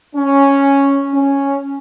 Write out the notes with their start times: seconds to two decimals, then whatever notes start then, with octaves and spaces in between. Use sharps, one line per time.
0.15 C#4
1.13 C#4